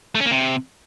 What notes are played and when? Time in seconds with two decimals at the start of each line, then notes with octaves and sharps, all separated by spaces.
0.15 A3
0.20 C#4
0.26 A#3
0.31 C3